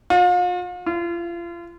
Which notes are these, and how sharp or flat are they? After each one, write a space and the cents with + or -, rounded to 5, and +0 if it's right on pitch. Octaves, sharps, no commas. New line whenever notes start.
F4 +40
F4 -35